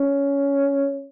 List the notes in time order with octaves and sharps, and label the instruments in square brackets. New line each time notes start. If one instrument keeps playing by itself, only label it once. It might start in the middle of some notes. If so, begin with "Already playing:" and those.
Already playing: [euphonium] C#4